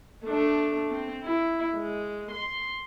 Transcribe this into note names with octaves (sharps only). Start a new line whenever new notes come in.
A3 D4
C4
E4
G#3
C6